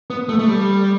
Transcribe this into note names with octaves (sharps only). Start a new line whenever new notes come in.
B3
A3
A3
G3